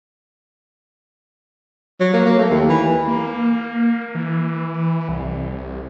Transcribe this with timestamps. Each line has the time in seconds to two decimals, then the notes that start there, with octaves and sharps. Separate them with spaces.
2.00 F#3
2.13 A#3
2.26 A#3
2.39 A3
2.50 D#2
2.69 E3
3.07 A#3
4.15 E3
5.09 C2